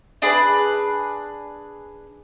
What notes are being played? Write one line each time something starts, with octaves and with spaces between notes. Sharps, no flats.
D4 G#4 B4